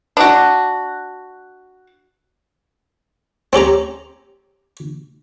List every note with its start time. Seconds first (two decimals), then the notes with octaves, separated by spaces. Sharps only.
0.17 D4 F#4
3.53 C4 C#4 G4 A#5